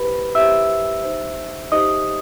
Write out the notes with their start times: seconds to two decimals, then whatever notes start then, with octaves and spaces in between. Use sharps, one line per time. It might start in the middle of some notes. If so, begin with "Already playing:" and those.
Already playing: E4 G4 B4 C5 B5
0.35 E4 G4 C5 E5 E6
1.03 D#4 G4 C5
1.72 D#4 G4 C5 D#5 D#6